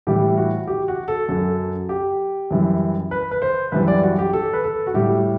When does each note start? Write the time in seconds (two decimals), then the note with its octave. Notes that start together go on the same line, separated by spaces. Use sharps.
0.07 A2 E3 G3 G4
0.37 F#4
0.67 G4
0.88 F#4
1.08 A4
1.29 F#2 F#3 A4
1.89 G4
2.51 F#2 E3 G3
3.11 B4
3.31 B4
3.42 C5
3.72 F#2 E3 G3 B4
3.88 D5
4.03 F#4
4.19 G4
4.33 A4
4.53 B4
4.64 A4
4.87 F#4
4.94 A2 G3 G4